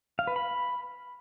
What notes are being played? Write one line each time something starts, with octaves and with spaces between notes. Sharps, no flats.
F5
B4
B5